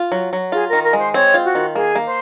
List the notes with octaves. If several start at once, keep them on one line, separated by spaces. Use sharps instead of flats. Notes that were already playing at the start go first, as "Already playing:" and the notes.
Already playing: F4
F#3
F#3
F4 G#4
D#3 A#4
A#4
G#3 C5
C4 C#5
F4
F#4
D#3
A#3 G#4
A#3
C5